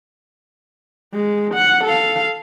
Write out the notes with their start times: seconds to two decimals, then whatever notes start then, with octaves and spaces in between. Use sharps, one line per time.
1.14 G#3
1.55 F#5
1.85 A4 F5